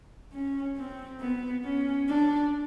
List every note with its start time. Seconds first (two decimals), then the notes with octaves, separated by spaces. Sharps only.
0.33 C#4
0.77 C4
1.20 B3
1.64 C#4
2.08 D4